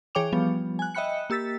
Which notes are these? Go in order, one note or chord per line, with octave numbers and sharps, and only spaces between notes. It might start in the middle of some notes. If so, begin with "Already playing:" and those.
E3 G#4 C#5 G5 D6 F7
F3 G3 B3
G#5 F#6
D#5 E5 G5 B5 F#6 C#7
A#3 G4 E6 A6 B6